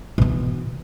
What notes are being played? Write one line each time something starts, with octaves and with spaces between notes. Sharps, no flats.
B2 E3